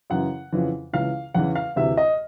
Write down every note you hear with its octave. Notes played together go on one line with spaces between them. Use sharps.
F#2 C#3 E3 F#5
F2 C#3 E3
C#2 C#3 E3 F5
E2 C#3 E3 F#5
F5
D2 C3 E3 E5
D#5